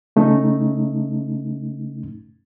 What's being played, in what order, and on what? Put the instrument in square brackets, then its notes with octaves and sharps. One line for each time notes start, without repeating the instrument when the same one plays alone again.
[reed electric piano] C#3 A3 C#4 D#4